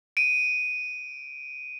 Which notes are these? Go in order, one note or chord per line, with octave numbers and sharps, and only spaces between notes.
D7 D#7